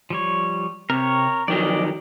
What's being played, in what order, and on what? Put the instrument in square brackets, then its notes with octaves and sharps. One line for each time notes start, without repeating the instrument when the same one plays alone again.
[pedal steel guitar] F3 G3 C#5
[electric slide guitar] C3 [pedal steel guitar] A#4 C#5
[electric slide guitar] F2 D#3 F#3 [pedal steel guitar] D5 D#5